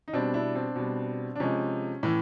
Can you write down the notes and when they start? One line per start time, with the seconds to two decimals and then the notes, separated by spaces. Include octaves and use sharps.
0.08 D#4
0.13 B2 G3 C4 D4
0.34 D4 E4
0.55 C4 D4
0.76 B2 G3
1.36 D4
1.40 C3 F3 G#3 C#4
2.03 A2 E3